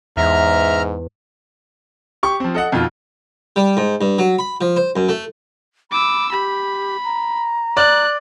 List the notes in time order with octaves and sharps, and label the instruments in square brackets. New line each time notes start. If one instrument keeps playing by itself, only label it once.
[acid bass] E2 [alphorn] G#2 [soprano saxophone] E5 [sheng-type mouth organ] A#5 F6
[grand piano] G4 C#6
F3 C4
A4 D#5 F#5
F2 B2 D#3 F4
[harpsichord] G3
G#2
G2
F#3
B5
F3
C5
F#2
A3
[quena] B5 [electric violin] D6 E6
[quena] G4 [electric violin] B5
[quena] A#5
[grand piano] D5 [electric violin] F#6